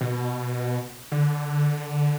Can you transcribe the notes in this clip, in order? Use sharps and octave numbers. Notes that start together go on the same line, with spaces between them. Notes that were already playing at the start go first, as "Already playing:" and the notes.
B2
D3